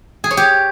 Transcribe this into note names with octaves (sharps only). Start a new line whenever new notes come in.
G#4
C#5
G4